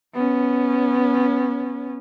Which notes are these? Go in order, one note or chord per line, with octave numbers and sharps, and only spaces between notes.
B3 C#4